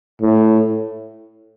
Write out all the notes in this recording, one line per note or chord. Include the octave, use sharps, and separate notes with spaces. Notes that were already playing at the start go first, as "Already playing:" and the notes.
A2